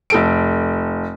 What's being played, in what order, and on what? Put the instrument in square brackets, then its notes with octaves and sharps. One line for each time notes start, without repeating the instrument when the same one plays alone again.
[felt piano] F1 A4 D7